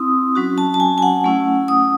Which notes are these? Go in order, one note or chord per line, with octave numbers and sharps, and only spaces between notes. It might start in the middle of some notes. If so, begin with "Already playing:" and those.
Already playing: C4 E4 D#6
F#3 C#4 F#4
A5
A5
G#5
G#5
F#5
A3 C#4 E4
D#6